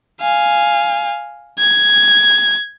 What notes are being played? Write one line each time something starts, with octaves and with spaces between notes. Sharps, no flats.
F5 G#5
G#6